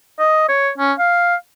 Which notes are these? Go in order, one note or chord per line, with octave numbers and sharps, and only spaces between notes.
D#5
C#5
C#4
F5